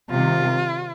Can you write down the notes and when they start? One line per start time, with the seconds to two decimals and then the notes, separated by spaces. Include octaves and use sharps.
0.11 C3 D#3 G3 F4